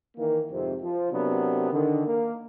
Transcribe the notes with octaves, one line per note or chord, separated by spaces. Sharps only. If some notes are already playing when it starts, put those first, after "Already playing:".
D#3 E3 A#3
F2 G#2 C3
F3
C3 F#3 A#3 B3 D4
D3 D#3
A#3